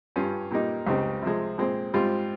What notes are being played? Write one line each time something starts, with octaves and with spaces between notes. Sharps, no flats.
G2 G3 C#4 F4
A#2 G3 A#3 D#4
C#2 C#3 G3 C4 D#4
C3 F3 G#3
A#2 G#3 C4
G#2 G3 C4 F4